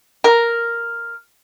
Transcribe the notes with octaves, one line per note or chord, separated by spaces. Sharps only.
A#4